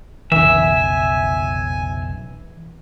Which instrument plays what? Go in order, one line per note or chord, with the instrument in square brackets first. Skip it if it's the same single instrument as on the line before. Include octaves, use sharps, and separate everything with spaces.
[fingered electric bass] F1 B1 C#3 [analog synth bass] E3 [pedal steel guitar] E5 [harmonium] G#5